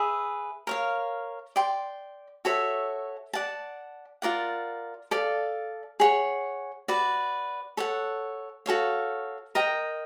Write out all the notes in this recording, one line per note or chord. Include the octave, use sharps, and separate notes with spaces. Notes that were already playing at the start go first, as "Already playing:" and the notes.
Already playing: G#4 B4 E5
A#4 C#5 F5
D5 G5 C6
F#4 A4 C#5 E5
D5 F#5 A5
F4 A#4 D5 F#5
A4 D5 F5
G#4 C#5 F#5
F#4 B4 D5
A4 C#5 F#5
F#4 A4 C#5 F5
A#4 D#5 G5 A#5